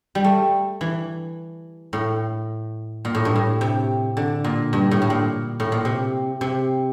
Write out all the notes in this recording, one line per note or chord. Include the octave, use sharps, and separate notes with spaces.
G3
A3
E3
A2
A#2
A2
G2
A2
C3
D3
A#2
G2
A2
A2
A#2
A2
A#2
C3
C3